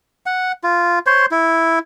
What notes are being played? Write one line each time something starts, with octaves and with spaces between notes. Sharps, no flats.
F#5
F4
C5 C#5 C6
E4